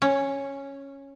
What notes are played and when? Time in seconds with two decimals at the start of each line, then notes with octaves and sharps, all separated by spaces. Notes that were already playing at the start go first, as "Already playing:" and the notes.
0.02 C#4